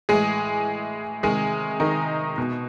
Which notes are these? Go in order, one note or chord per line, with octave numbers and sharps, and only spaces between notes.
A2 E3 G#3 G#4
C3 D#3 G#3 G#4
D#3 D#4
B2